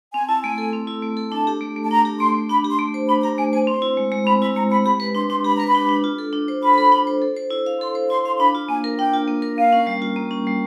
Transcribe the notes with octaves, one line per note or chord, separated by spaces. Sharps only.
C4 G#5
E4 A5
A3 G#5
A4
C4
E4
A3
A4
D4 A5
G4
A3
A3
A5
D4 A#5
G4
A3 C6
A3
D4 B5
G4
C6
A3
C5
D4 B5
G4 A#5
A3 G#5
C5 G#5
C4 C6
E4
G#3
G#3
C4 B5
E4 B5
G#3 A#5
G#3 B5
G4 B5
B4 B5
D4 C6
D4 C6
G4 B5
B4 A#5
B5
D4
D4
F4
A4
D4
C5
F4 B5
A4
D4
C5
A4
C5
E4
F5
A4 C6
C5
E4 C6
F5 C6
D4 B5
F4
A#3 G#5
A#4
D4 G5
F4
A#3
A#4
A#3 F5
C#4
G3
F4
A#3
C#4
G3